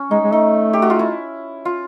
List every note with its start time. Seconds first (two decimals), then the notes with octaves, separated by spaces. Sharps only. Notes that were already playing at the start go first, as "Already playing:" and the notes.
Already playing: C#4
0.11 G#3 D#4
0.24 G#3
0.32 A3 D#4
0.73 G4
0.82 F#4
0.90 F4
0.99 E4
1.65 F4